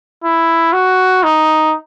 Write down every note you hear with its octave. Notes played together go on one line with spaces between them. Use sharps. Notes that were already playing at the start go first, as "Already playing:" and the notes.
E4
F#4
D#4